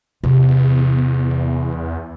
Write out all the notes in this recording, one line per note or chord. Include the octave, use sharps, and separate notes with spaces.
E2 C3